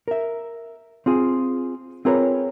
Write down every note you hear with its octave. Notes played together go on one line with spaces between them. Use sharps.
A#4 E5
C4 F4 G#4
C4 F4 G#4 A#4 B4 C#5